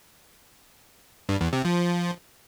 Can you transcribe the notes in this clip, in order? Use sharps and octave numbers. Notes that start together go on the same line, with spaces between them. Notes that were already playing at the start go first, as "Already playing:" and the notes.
G2
E2
C3
F3